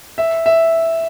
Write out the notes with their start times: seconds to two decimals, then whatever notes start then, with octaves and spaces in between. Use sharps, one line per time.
0.18 E5
0.46 E5